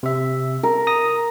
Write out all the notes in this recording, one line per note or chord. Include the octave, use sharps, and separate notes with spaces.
C3 E5
A#4
A#5 D#6 A#6